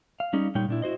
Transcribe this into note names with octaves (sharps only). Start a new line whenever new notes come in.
F5
G3 C#4 D#4 G#4
A#2 G3 D#4 C#5 G5
A#2 D4 E4
E4 F#4 C5 D#5